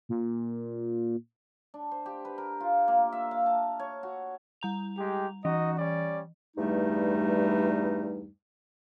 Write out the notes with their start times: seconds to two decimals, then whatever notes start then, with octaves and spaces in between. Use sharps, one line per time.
0.09 A#2
1.74 D4
1.91 C5
2.06 G4
2.25 B4
2.38 A#4
2.60 F4
2.88 A#3
3.12 E5
3.31 F5
3.46 A5
3.79 C#5
4.03 F#4
4.61 G3 A#5 F7
4.98 G#3 G4
5.45 E3 D#4 F#4 D#5
5.79 G3 C#4 D5
6.57 E2 G2 G3 A3 D#4